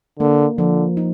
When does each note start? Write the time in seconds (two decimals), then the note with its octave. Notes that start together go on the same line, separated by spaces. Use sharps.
0.20 D3 A#3
0.58 D3 F3
0.97 D#4